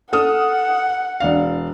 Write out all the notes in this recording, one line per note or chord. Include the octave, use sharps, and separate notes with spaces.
A4 F#5 D#6 F6
E1 D4 F5